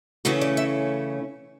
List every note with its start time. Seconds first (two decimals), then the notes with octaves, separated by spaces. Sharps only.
0.25 C#3 E3 A3 C#4 F#4
0.41 D5
0.57 E5